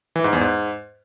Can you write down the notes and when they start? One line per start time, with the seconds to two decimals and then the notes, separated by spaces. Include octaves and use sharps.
0.16 E3
0.24 G#2
0.33 E2
0.41 G#2